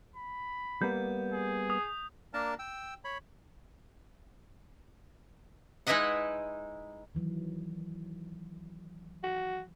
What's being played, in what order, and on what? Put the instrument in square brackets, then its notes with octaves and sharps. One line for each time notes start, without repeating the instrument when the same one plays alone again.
[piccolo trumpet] B5
[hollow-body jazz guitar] G3 A#3 B3 [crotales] G6
[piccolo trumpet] G#4
[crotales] D#6
[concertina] A#3 D4 A#4 A5
G5 E6
C#5 B5
[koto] G#3 D#4 E4 B4 D#5 F#5
[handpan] D#3 E3 F#3
[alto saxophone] F#4